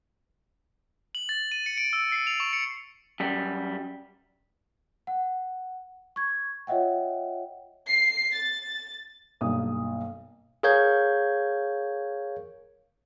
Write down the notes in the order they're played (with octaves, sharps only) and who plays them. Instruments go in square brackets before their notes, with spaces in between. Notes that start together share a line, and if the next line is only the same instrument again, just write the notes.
[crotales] F#7
A6
D#7
C#7
D7
E6
C7
F7
C#6
C#7
[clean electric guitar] F#2 G3
[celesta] F#5
C#6 G#6
F4 C#5 D#5 E5 F#5 G5
[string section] C7
A6
[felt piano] B1 G2 A#3 D#6
[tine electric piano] G#4 A#4 C#5 F5 G6 G#6